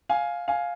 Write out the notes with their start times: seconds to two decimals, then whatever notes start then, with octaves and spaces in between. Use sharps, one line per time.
0.09 F5 G#5
0.48 F5 G#5